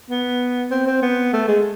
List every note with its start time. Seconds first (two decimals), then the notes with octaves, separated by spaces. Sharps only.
0.10 B3
0.71 C4
0.86 C4
1.02 B3
1.33 A3
1.48 G#3